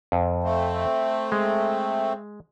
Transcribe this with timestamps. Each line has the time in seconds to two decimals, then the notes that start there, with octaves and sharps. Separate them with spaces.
0.12 F2
0.44 A3 C4
1.32 G#3